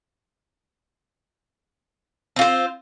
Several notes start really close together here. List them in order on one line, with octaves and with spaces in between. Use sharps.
C4 F4 C5